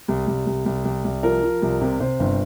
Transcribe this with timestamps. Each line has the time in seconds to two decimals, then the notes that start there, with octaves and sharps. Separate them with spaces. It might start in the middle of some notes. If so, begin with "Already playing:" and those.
0.08 C2
0.27 C2
0.47 C2
0.66 C2
0.85 C2
1.04 C2
1.23 F3 A#4
1.43 F3
1.62 C2
1.81 C3
2.00 C3 C5
2.20 G1